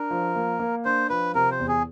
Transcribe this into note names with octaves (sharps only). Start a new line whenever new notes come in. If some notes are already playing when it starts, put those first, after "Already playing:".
Already playing: D4 A#4
F3
A#3
A#3
D4 C5
F3 B4
C3 A#4
C5
E2
G#4